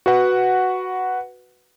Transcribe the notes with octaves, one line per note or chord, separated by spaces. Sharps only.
F#4 B4 F#5